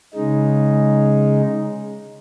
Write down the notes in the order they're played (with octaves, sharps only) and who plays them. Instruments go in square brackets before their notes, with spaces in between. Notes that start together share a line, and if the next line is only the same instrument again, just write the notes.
[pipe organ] C#3 G#3 D#4